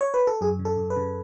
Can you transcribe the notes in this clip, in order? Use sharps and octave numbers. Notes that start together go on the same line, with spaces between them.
C#5
B4
A4
F#2 G#4
C#3
A4
F#2
B4
C#3